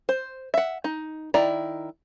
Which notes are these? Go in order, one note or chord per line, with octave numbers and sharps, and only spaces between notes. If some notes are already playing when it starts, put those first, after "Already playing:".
C5
E5 F#5
D#4
D#3 E4 D5 A#5